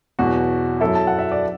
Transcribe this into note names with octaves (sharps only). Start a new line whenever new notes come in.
E2 B2 F#3 F#4
F#2 F#3 E4 A4
A5
F#5
E5
D5